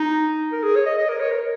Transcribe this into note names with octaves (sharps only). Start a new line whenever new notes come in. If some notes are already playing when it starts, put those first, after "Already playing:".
Already playing: D#4
A#4
G#4
C#5
D#5
D#5
A#4
C#5
A#4